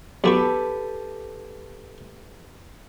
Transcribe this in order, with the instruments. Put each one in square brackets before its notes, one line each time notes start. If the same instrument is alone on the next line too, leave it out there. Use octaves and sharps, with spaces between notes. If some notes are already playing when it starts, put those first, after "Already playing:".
[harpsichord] B1 F#4 C#6 [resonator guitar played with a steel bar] G4 A4 B4